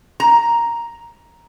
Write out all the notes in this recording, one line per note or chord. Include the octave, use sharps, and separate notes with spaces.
A#5